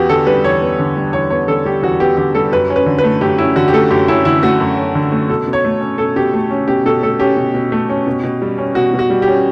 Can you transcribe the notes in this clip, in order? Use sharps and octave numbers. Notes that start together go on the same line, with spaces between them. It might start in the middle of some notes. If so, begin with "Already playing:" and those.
Already playing: E2 B3 F#4 G4
D3 A4
G3 B4
E2 C#5
B3
D3
G3
E2 C#5
B3 C#5
D3 A4
G3 G4
E2 F#4
B3 G4
D3 G4
G3 A4
F#2 B4
C#4
B4
D3
B4
A3
F#2 G4
C#4 E4
D3 F#4
G4
A3 A4
F#2 G4
C#4 E4
D3 E4
A3 F#4
F#2
C#4
D3
A3
B2 A4
B2
C#5
A3
C#4
B2 A4
B2 G4
A3
C#4
B2 G4
B2 A4
A3 A4
C#4 G4
B2
B2
A3
C#4
B2
B2
G3
C#4
B2 F#4
B2
F#4
G3
G4
C#4